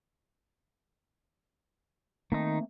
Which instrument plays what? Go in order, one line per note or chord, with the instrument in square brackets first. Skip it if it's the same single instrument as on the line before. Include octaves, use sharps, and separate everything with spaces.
[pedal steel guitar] D#3 D#4 [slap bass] A3 A#3 C4